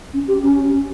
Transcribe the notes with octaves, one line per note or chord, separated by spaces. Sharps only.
C#4
G4
C#4
C#4